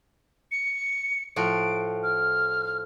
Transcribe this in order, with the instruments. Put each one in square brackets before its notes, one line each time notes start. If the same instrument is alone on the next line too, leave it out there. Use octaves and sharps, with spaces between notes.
[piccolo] C#7
[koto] A2 F3 F#4 [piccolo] D7
[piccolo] F6